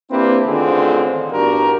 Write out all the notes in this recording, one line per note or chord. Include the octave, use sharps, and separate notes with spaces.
A#3 C4 D4 E4 G4 B4
A1 D3 D#3 C4 F4 G#4
E2 G2 D4 F#4 G4 A#4